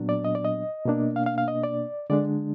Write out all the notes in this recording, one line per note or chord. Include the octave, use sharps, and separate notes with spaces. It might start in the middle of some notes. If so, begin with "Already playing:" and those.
Already playing: A#2 F#3 B3 D4
D5
D#5
D5
D#5
B2 A#3 D4
F5
F5
F5
D#5
D5
D3 G#3 D4 D5